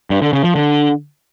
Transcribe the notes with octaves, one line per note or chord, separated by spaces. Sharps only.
G2
D3
C#3
F3
D3